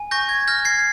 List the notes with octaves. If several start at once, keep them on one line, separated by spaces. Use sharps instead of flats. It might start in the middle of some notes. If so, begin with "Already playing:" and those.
Already playing: G#5
C#6 G6 A#6
G#6
F6 G6 A#6
G#6 C7